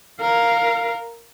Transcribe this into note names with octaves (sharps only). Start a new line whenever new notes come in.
A#4 F5